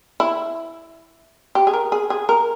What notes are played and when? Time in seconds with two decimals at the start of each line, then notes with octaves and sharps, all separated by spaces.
0.20 E4
1.55 G4
1.67 G#4
1.73 A#4
1.92 G#4
2.10 G#4
2.29 A#4